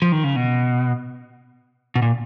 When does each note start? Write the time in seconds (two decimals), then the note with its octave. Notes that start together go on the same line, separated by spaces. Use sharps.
0.02 F3
0.12 D#3
0.24 C#3
0.36 B2
1.95 B2
2.02 A#2